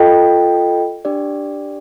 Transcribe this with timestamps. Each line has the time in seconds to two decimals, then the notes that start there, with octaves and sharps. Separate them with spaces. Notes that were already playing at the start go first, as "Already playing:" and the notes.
Already playing: F4 A4 D#5 G5
1.05 D4 G4 D5